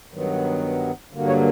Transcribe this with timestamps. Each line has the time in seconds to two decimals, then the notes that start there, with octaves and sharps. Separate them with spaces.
0.12 G2 D#3 F#3 B3
1.11 G2 D3 F#3 A#3
1.28 C#5